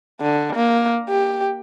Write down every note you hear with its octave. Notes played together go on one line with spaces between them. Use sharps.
D3
A#3
G4